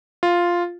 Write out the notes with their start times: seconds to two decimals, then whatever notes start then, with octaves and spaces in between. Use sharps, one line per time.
0.23 F4